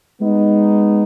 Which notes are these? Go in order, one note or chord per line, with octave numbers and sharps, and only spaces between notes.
G#3 B3 D#4